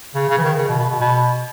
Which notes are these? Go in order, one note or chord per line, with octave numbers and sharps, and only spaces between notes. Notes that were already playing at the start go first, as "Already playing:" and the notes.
C#3
C#3
E3
D#3
C#3
B2
B2
B2
B2